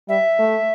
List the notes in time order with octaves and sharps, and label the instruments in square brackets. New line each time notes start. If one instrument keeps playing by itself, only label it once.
[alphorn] G3 [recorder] E5
[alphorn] A3